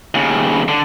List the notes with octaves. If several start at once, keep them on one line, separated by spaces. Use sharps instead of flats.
D#2 C#3
D3